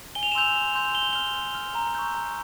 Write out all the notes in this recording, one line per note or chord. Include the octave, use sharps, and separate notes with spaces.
G#5 G7
F7
E7
C6 E6 G6 F7
G#5
C6 E6 G6
C6 G7
F6 G7
C6
F6
A#5
C#6 E6 G6
A#5